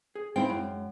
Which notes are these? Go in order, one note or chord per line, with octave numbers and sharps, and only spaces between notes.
G#4
G#3 C4 E4 F5 G5
F#2